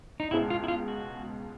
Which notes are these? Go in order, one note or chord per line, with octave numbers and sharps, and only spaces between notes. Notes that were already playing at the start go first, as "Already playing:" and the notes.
D#4
C#2 B2 G#3 C#4 E4
F4
E4
F4
F#4